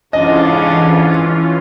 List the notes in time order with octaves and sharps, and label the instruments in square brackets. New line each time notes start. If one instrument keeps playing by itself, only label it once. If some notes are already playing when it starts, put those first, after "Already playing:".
[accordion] F2 G#2 C#3 [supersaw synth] E3 C#4 F4 [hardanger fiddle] D4 [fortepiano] D#5